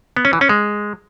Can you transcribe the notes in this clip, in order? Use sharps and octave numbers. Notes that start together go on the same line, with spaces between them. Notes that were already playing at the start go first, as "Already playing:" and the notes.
B3
C#4
E3
C#4
G#3